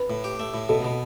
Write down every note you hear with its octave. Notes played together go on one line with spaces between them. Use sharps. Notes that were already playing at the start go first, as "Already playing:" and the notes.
Already playing: B4
A2
G4
A3
A2
B2 A4
B2